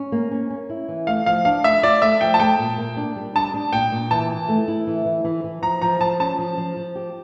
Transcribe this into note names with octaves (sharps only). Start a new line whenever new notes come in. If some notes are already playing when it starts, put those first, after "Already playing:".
Already playing: C#4
A#3
C#4
C#4
E4
E3
A3 F5
F3 F5
D4 F5
A3 E5
F4 D5
A3 E5
F3 G5
A5
A3 G5
A#2
A#3
D4
G3
D4 A5
D4
A#2 G5
A#2
E3 A5
E4
A3
E4
E3
E3
E3
E3
F3 A#5
F3 A#5
F3 A5
C#4 A5
F3
F3
F3
G4